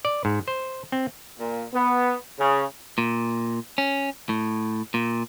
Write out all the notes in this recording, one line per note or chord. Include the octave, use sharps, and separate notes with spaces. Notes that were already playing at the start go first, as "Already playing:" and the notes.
D5
G#2
C5
C4
A#2
B3
C#3
A#2
C#4
A2
A#2